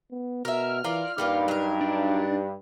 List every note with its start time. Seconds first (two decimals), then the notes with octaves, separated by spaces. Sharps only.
0.11 B3
0.45 B2 A#4 E5 F6
0.84 E3 F4 A#4 D5
1.18 G2 G3 A#3 D#4 F4
1.48 F#3 A#4
1.81 D4